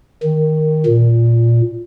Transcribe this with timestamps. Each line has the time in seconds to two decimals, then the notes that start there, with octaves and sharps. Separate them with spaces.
0.23 D#3
0.86 A#2